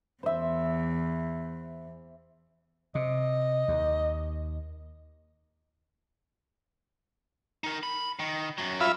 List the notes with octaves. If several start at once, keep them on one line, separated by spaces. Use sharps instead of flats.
E2 C5 E5
C3 D#5
D#2
D#4 A#4
B5
D#3
F#2 F#3
F4 E5 B5